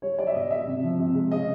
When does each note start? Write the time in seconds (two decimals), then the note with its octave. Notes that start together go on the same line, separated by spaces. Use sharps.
0.02 G3 C#5
0.18 G3 D5
0.27 E5
0.34 B2 D#5
0.50 B2 E5
0.67 C3
0.83 F3
0.99 C3
1.15 G#3
1.31 C#3 D#5